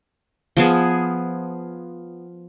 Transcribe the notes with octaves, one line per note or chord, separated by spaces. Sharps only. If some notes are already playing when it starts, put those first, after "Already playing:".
F3 B3 G#4